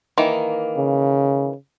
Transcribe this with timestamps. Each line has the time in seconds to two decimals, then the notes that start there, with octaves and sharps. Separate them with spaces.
0.18 D#3 E3 A#3
0.77 C#3